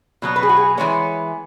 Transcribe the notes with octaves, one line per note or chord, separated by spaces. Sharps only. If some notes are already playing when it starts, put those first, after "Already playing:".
B2 F#3 B3
B4
G#4
F#4
G#4
E3 G#3 B3 C#5